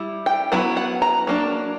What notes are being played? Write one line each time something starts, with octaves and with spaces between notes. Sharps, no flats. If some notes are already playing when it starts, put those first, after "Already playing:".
Already playing: G3 E4
G5
F#3 B3 E4 F#5
F#5
A#5
F#3 A#3 D4